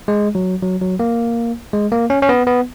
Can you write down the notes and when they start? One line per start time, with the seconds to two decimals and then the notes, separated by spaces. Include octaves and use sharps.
0.08 G#3
0.35 F#3
0.63 F#3
0.81 F#3
1.00 A#3
1.73 G#3
1.92 A#3
2.10 C#4
2.22 C#4
2.29 B3
2.47 B3